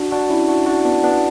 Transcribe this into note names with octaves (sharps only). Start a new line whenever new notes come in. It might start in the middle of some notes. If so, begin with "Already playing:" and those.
Already playing: D4 F#4
D4 F#4
C#4 E4
D4 F#4
D4 F#4
B3 D4
B3 D4